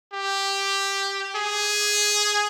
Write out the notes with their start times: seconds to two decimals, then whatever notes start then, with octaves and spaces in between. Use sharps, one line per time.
0.14 G4
1.36 G#4